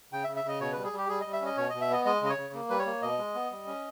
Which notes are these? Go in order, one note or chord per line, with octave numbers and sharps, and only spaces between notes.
C#3 G5
E5
C#3
E5
C#3 D#5
B2 C#5
G3 B4
G#4
G3 G4
G3 G#4
G3 D#5
E5
C#4 D#5
B2 C#5
B2 D#5
E5
B3 D#5
G#3 D#5
C#3 D#5
C#5
C#3
A#3
G3 B4
C#5
A#3
B2 D#5
G#3
B3
G3
C#4